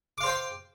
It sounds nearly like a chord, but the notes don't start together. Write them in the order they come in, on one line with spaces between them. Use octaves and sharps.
D6 F5 C5 G5 C6